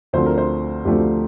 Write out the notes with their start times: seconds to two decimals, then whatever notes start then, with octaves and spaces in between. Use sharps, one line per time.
0.13 D2 D3 F3 A3 C4 C5
0.26 A#4
0.38 C5
0.85 D2 D3 F3 A3 C4 G4